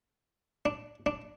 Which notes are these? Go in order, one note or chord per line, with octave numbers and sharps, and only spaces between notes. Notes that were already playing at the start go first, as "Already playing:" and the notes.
D4
D4